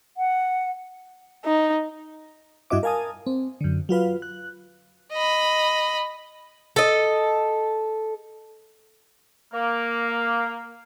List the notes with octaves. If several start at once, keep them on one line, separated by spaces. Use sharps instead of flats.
F#5
D#4
G2 E4 F#4 D#5 E5 D6
A#4 F5 G#5 A5 D#6
C4
F#2 D3
F#3 F4 B4 F5
F#6
D#5 B5
A4 D#5
A#3